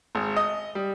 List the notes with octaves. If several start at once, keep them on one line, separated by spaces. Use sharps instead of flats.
G#1
D#5
G3